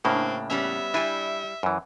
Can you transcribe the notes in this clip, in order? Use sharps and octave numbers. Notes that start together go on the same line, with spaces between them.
A2 C#3 A#3 C4 D4
G3 B3 C#4 E5
G3 D4 E4 G#5
F#2 E3